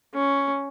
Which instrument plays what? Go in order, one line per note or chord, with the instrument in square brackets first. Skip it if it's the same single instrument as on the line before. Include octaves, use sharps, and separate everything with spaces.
[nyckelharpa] C#4